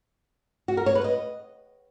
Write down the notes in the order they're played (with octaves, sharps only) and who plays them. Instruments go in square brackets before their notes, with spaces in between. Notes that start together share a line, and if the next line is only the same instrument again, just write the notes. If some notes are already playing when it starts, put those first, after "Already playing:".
[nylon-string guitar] F#4
A#4
C#5
B4
D#5